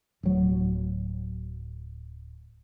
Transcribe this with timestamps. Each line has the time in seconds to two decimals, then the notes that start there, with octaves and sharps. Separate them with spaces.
0.23 D1 F#3